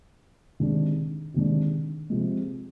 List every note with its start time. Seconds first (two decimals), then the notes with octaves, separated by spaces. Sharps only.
0.60 C3 D#3 G#3 D4
1.34 C3 D#3 G#3 D4
2.10 C3 F3 G#3